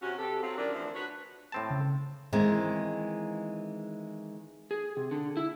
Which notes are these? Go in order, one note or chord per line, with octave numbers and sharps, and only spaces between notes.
C3 C#4 F#4
C3 G4 A4
F#3 C4 F4
C#3 F3 G3 D4 E4 A#4
D2 D3 E3 F3 C4 D4
D4 F#4 B4 C#5
A2 C4 A5
C#3
D#3 E3 G#3 A#3 C4
G#4
C3
D3
E4